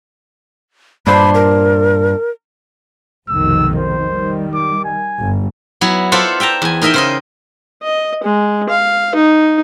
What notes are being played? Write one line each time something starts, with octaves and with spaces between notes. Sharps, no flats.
G2 A#2 D4 C5 B5
A#4
F1 B1 D#3 E6
C5
D#3 G3
D6
G#5
G1 G2
F#3 B3 E4
F4 A4 C5 D5 E5 F#5
E5 G5 A5 A#5
E2 G#5
D#4 A#4 D#5 E5 G5
C#3 C5 D#5
D#5
G#3
F5
D#4